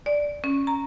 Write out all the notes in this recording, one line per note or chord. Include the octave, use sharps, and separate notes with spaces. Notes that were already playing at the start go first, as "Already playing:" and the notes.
D5
C#4
A#5